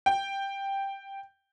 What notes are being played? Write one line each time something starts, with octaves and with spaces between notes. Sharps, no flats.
G5